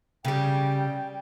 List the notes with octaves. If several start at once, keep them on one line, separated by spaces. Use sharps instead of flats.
C#3 G3 G5